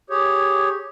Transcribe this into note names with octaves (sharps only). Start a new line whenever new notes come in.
G4 G#4 C#5